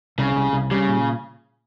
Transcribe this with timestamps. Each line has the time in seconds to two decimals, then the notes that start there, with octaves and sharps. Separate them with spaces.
0.18 C2 C#3
0.36 C2
0.53 C2
0.71 C#3 G3
0.88 A#2